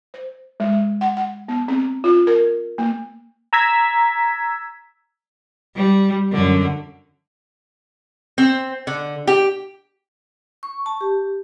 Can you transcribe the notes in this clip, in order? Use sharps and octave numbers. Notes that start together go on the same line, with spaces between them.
C5
G#3
F#5
F#5
B3
C4
F4
A#4
A#3
A#5 E6 G#6 B6
G3
F#2 D3
C4
D3
G4
C#6
A5
G4